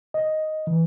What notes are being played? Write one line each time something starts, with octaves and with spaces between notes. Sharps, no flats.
D#5
E3